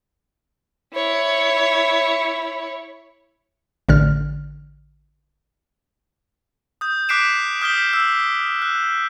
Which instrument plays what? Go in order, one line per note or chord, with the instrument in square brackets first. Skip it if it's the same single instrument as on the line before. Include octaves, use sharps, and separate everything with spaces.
[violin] E4 C#5
[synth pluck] A1 D3 F6
[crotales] D#6 G6
D6 F#6 B6 C7 D7 E7
D#6 F6 G6 B6 G7
E6
F#6